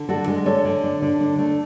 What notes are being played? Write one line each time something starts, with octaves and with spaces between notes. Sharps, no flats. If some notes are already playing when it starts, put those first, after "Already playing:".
Already playing: D3
D4 F#4 A4
G#3
D3 A4 C#5
D3
D4
D3
D4
A3